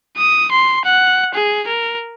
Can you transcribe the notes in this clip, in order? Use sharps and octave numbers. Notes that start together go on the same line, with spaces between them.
D#6
C6
F#5
G#4
A#4